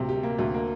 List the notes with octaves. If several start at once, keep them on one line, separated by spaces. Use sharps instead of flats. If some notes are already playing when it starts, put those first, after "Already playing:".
Already playing: D2 C3 A#3
G4
A#3
D2
A#3